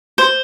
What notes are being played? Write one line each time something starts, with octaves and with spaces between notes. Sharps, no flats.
C5